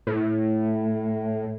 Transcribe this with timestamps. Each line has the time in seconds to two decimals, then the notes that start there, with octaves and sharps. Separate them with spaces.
0.07 A2